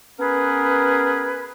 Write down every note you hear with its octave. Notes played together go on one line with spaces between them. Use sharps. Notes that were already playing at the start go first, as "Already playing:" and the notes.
B3 C#4 G#4 A#4 B4